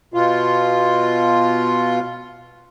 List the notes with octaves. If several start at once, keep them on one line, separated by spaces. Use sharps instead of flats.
B2 F4